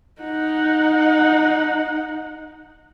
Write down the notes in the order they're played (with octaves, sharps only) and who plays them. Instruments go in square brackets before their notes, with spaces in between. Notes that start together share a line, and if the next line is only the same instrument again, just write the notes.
[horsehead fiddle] D#4 F#5